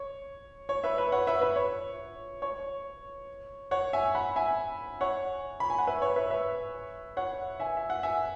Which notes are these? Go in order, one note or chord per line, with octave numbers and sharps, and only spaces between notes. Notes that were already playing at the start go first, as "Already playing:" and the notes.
Already playing: C#5
C#5
B4 E5
B4 E5
C#5 F#5
B4 E5
B4 E5
C#5
C#5
C#5 F#5
E5 G#5
F#5 B5
E5 G#5
C#5 F#5
B5
G#5
F#5
B4 E5
C#5
B4 E5
B4 E5
C#5 F#5
E5 G#5
E5
F#5
E5 G#5